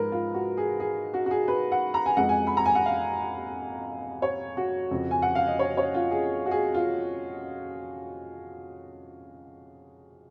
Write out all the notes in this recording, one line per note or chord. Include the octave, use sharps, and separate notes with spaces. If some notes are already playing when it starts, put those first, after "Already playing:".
Already playing: G#2 F3 G#3 A#4 B4
F4
F#4
G#4
G#4
F#4
F#4
G#4
B4
F#5
A#5
G#5
F2 F3 G#3 F#5
G#5
B5
A#5
G#5
F#5
F5
C#5
F#4
F2 C#3 F3
G#5
F#5
F5
D#5
C#5
C#5
F4
G#4
F#4
G#4
F4